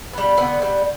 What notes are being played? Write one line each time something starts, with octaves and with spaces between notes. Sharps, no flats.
G3 B3
D3 B3
G3 B3